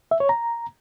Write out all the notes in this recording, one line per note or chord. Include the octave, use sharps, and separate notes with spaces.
E5
C#5
A#5